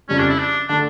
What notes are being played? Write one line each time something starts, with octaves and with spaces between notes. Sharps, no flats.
F2 C#3 G3 C#4
D4
E4
D4
D3 A3 D4